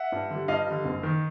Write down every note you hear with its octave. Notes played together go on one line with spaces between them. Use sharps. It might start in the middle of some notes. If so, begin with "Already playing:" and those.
Already playing: E5 F#5
G2
D3 G3
G2 D#5 F5
D3 G3
F#1
D#3